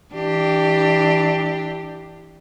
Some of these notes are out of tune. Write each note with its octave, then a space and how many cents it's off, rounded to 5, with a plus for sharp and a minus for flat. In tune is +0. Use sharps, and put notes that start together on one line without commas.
E3 -15 D4 +15 G4 +0